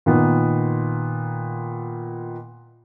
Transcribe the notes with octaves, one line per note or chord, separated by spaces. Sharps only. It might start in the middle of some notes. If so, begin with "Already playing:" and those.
A#2 D#3 B3